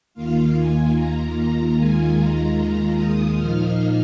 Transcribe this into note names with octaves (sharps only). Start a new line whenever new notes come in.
D#2 D#3 A#3 F4 F5
G#5
A#5
A#5
D#2 D#3 G#3 F4 G#5
A#5
D#6
A#2 F3 A#3 D#4 F6